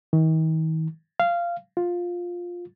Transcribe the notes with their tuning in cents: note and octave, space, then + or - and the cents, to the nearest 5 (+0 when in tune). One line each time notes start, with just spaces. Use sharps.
D#3 +40
F5 -15
F4 +10